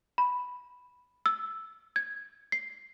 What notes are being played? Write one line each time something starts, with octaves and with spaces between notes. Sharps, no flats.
B5
E6
G#6
C7